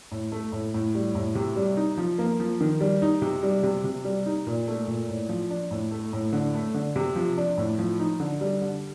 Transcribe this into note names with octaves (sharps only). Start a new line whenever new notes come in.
A2
A3
A2
A2
G3
A2
C3
G3
D#4
F3
A#3
F3
D#3
G3
D#4
C3
G3
C3
C3
G3
D#4
A#2
A3
A#2
A2
F3
D4
A2
A3
A2
D3
A3
D3
C3
F3
D4
A2
F3
D#4
D3
G3
D3